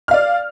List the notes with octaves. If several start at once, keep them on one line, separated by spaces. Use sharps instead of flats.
D5 F5 F6